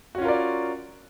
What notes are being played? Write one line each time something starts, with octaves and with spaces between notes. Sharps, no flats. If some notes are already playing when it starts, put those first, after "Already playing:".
C#4 F4 F#4 A#4 D5